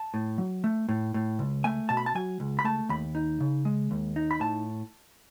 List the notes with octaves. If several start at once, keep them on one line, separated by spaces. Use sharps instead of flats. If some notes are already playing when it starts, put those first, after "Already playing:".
Already playing: A5
A2
F#3
A3
A2
A2
C#2
A3 G#5
B2 A5
B5
A5
F#3 G#5
C#2
B5
A3 A5
D#2 B5
D#4
C#3
G#3
D#2
D#4
B5
A2 A5